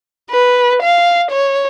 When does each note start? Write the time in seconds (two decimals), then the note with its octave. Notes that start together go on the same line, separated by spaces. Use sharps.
0.30 B4
0.82 F5
1.31 C#5